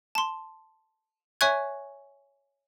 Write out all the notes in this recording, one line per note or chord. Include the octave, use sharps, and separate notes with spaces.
A5 C6
C#5 E5 G#5 C#6 F#6 G#6